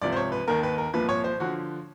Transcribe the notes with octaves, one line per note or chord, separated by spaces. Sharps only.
C#2 C3 F3 D5
C5
C#5
B4
D#2 D#3 A#4
B4
A#4
C2 A#2 F3 B4
C#5
C5
D3 F3 F#4